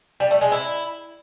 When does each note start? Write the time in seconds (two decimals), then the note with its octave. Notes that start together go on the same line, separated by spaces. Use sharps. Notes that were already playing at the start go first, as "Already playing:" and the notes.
0.20 G3
0.31 A3
0.41 G#3
0.52 E4